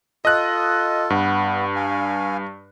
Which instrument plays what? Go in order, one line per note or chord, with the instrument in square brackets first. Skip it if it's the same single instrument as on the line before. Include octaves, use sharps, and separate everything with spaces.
[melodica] F4 A4 [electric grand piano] D#5 F#6
[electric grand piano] G2 [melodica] B3
[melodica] F5 G#5